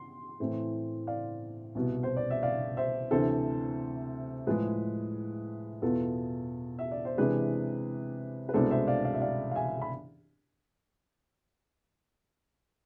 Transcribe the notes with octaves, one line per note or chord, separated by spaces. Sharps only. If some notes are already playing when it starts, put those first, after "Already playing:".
Already playing: C6
A2 E3 A3 C4
D5 F5
C2 B2 B3
C5
D5
E5
D5 F5
C5 E5
D2 C3 E3 A4 C5
A2 F3 G#3 G#4 B4
E2 B2 B3 F4 A4
E5
D5
C5
C3 E3 G#3 D4 G#4 B4
B4
C2 B2 G#3 D4 A4 C5
C5 E5
D5 F5
D5 F5
E5
D5 F5
F5
E5 G#5
B5